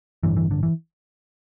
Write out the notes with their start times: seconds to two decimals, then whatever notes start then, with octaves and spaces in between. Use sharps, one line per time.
0.23 A1 G2 D3 E3
0.37 E3
0.51 D3
0.63 E3